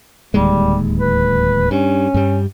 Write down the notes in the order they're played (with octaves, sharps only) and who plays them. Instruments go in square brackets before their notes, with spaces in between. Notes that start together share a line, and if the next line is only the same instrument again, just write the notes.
[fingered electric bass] D1 D#2 G#3 [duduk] G3
[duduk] B4
[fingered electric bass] G2 [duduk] C#4
[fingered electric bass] G2 G3